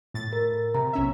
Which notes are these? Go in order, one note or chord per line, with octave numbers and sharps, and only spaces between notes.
A2 A6
A#4
C3 A#5
B1 C#4 E5